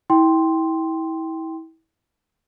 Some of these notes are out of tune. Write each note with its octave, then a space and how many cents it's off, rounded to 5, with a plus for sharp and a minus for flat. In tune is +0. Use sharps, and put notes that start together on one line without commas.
E4 -30 G5 +0 C6 +0